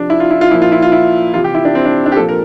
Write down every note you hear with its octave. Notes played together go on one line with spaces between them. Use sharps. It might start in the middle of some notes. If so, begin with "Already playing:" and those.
Already playing: C3 F3 D4
E4
F4
E4
F4
A#2 F3 E4
F4
E4
F4
E4
C3 E3 F4
G4
E4
D4
C4
D4
D4
G4
A#2 F3 A4
A#4